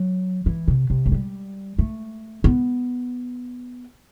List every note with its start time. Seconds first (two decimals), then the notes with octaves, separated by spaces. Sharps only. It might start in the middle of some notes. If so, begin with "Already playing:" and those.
Already playing: F#3
0.46 E3
0.68 C3
0.90 C3
1.06 A3
1.12 G3
1.79 A3
2.44 B3